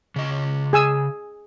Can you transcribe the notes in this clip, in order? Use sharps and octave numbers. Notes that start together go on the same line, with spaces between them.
C#3 D#5
G#4 G#5 E6